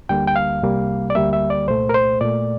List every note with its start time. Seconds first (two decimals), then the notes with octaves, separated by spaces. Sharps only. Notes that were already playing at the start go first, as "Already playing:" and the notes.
0.09 D2 D3 G3 A#3 G5
0.28 G5
0.36 F5
0.62 C2 C3 G3 A#3
1.10 D5
1.15 D2 D3 G3 A#3 E5
1.33 E5
1.50 D5
1.68 C2 A#2 A3 C5
1.89 A#4
1.94 C5
2.21 A#2 A3 D5